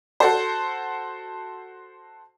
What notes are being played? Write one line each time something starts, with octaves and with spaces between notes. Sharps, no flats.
F#4 A4 C5